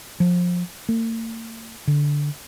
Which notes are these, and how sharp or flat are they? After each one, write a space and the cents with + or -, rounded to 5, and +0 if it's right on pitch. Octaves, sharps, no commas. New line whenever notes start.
F3 +20
A#3 -45
D3 -10